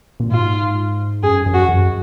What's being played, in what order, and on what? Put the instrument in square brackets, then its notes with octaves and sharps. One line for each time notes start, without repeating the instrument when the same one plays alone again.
[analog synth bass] A#2
[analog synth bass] G#2 [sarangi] F4
[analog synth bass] F#2 [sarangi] G#4
[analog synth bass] F#2
[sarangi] F#4
[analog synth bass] F#2